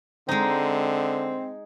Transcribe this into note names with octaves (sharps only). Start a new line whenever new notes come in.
D3 G#3 C4 D#4